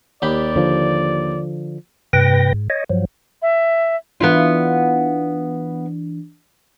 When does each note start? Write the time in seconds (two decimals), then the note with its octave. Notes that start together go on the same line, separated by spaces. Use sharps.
0.22 D#2 G4 D5 B5
0.56 D3 F3
2.13 G2 C3 B4 G5 A#6
2.54 G#2
2.70 C#5 D#5
2.90 G2 F3 F#3
3.42 E5
4.20 E3 B3 D4 E4 F4